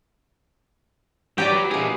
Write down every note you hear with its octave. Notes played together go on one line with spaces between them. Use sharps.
F#3 G4 B4 D5 G5 A#5 D6
A#2 E4 G#4 D#5